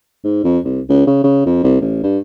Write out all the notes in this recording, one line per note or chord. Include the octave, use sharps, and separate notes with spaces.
G#2
F2
C2
C#2
C#3
C#3
F2
C2
A1
G2